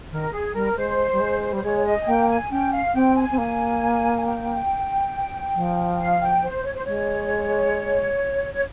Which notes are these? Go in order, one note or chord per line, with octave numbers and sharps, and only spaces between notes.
D#3 A#4
G#4
G3 A#4
G#3 C5
G3
G#3
G3 C5
G#3 C#5
D#5
G#5
A#3 G5
G#5
C#4 G5
F5
C4 G5
G#5
C4
A#3 G#5
G#5
G5
F3
F5
G5
C5
C#5
C5
G#3 C#5
C#5